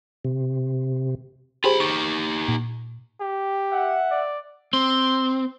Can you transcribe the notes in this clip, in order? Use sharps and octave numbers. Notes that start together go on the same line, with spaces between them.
C3
F4 G4 G#4 C5 B5
D#4 G4 C#6
A#2
G4
E5 F#5
D5
C4 C6